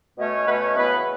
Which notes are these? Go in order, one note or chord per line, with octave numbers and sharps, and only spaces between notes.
B2 A3 C#4
B2 A3 C#4 B4
C#5
C#3 E3 B3 B4